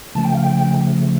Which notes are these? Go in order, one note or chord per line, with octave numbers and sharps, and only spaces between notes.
C#3 F3 A3 A5
G5
F5
G5